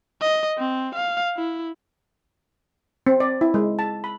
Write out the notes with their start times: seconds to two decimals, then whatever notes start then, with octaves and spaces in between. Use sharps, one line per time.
0.21 D#5
0.58 C4
0.95 F5
1.37 E4
3.07 C4
3.20 D5
3.41 E4
3.54 G#3
3.79 A5
4.04 B5